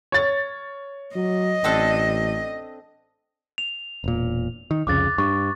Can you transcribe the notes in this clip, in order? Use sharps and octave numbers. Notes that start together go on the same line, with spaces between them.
C#5 A6
F#3 D#5
A1 C4 D4 A4
F7
E1 A#2
D#3
C2 F2 C#3 D6 F#6 A6
G2 C#6